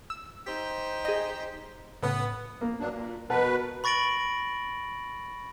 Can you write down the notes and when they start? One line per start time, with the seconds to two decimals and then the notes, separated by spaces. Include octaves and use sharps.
0.10 E6
0.46 D#4 G4 C5
1.05 G#4 D#5
2.03 A2 C#3 B3
2.61 A#3
2.80 G2 F#3 D4
2.94 A#2
3.30 B2 A#4 B4 F#5 A5
3.84 B5 C#6 A6 A#6 D7 F#7